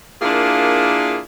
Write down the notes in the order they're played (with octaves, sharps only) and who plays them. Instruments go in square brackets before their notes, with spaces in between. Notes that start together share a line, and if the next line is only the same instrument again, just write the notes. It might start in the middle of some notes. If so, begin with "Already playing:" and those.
[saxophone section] A#3 D4 E4 F4 G#4 A#4